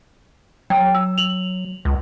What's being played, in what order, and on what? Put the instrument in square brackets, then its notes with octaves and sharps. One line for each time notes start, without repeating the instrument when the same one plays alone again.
[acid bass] F#3 [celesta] G5
[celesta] E6
F7 F#7
[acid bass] C#2